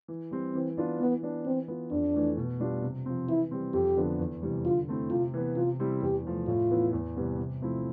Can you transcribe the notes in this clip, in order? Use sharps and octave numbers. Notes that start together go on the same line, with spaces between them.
E3
G3 C4
E3 C4
B3 D4 F4
E3 B3
B3 D4
E3 C4
B3 F4
F2 D4
E3 A3
B2
G3 D4 F4
C3
F3 C4
E3 E4
G3 C4
F2 G4
D3 F3 B3 D4
E2
C3 E3 G3
D3 F4
A3 C4 E4
C3 F4
E3 B3
C3 F4
G3 C4 E4
E2 G4
C3 F3 A3
A2 F4
E3 B3 E4
E2
C3 E3 G3 B3
C3
F3 A3 C4 E4